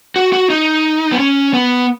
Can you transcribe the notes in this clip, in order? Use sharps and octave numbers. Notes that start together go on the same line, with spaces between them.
F#4
F#4
D#4
B3
C#4
B3